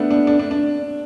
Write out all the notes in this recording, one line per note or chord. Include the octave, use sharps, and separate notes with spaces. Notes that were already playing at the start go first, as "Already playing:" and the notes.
Already playing: A3 B3 D4
D4
D4
D4
D4